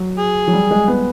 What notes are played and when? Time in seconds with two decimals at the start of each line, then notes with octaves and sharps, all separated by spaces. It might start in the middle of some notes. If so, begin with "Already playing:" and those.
Already playing: F#3
0.18 G#4
0.48 F#3
0.53 G3
0.71 G#3
0.88 B3